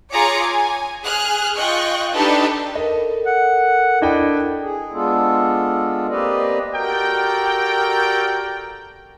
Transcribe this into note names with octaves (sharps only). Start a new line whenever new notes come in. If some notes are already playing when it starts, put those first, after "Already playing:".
F4 G#4 C#5 A#5 D6 C#7
G#5
G#4 F6 F#6
F4 D#5 G5 C#6 F#6
D4 D#4 G4 A4 B4 D#5
A4 A#4 D#5
F#5
D4 E4 D#5 G5
G#4
G#3 B3 D4 F4 A4
A#3 C4 G4 B4 D5 D#5
F#4 G4 A4 A#4 D5 G5